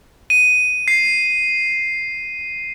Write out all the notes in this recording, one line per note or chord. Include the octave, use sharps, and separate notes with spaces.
D#7
C7